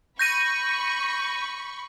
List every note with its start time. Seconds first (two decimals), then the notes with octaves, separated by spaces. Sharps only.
0.19 B5 C#6 G6 A#6 D#7